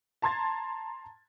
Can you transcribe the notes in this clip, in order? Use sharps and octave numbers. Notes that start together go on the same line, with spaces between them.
A5 A#5 C6 G#6 A6